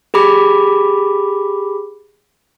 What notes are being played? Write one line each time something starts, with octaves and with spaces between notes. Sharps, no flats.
G4 G#4 B5 D6